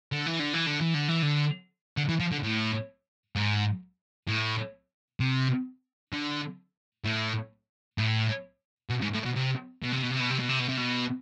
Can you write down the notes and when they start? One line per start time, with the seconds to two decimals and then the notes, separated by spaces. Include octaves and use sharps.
0.12 D3
0.26 E3
0.40 D3
0.54 E3
0.67 D3
0.81 E3
0.95 D3
1.09 E3
1.22 D3
1.97 D3
2.09 E3
2.20 F3
2.31 D3
2.43 A2
3.35 G#2
4.28 A2
5.20 C3
6.13 D3
7.05 A2
7.98 A2
8.89 B2
9.02 G#2
9.13 A2
9.25 B2
9.35 C3
9.82 B2
9.92 C3
10.02 B2
10.11 C3
10.20 B2
10.30 C3
10.39 B2
10.49 C3
10.59 B2
10.68 C3
10.77 B2